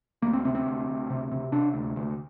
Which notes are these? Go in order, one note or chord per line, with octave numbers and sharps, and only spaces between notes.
D2 A#3
C4
C3 C4
C4
D2
D2
C3
C3
C3 D4
D2
D2